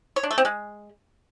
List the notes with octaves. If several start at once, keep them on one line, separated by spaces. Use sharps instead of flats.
C#5
D4
A3
C4
G#3